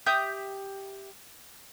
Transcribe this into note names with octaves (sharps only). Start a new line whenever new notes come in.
G4 E5 D#6 G6